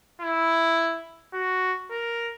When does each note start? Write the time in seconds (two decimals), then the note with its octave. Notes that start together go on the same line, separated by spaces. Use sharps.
0.22 E4
1.34 F#4
1.91 A#4